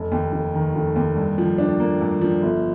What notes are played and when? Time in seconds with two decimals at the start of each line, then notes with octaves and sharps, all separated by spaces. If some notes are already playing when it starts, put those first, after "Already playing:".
Already playing: F1
0.12 D#2
0.33 F1
0.54 D#3
0.76 F1
0.96 D#2
1.17 G2
1.38 F3
1.58 D4
1.80 A#3
2.01 G2
2.21 F3
2.42 G1